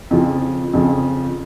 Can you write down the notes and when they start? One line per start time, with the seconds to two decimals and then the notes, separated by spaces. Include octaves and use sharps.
0.11 F2 C#3 F3
0.73 F2 C#3 F3